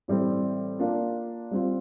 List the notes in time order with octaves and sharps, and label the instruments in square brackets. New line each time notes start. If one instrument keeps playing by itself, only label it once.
[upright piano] A2 E3 G3 C4
A#3 D4 F4
G3 C4 F4